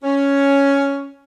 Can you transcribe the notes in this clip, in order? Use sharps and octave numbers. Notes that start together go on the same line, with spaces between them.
C#4